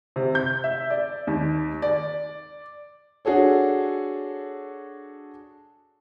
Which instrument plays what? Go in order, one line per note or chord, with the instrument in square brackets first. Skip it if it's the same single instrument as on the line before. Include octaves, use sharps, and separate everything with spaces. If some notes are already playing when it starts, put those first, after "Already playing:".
[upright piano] C3
G6
E5
D5
D#2
D5
[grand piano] D4 F#4 G#4 A4 C#5